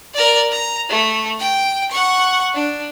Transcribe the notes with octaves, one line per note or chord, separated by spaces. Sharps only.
A#4 D5
A#5
A3
G5
F#5 C#6
D4